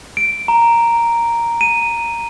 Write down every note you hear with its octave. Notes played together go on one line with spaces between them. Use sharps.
D7
A#5
D#7